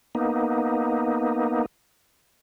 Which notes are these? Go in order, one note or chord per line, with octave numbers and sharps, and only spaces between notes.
A#3 B3 D#4